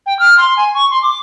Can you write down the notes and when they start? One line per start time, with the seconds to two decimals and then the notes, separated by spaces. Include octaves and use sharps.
0.06 G5
0.19 F6
0.37 C6
0.57 G#5
0.75 C#6
0.90 C6
1.03 D6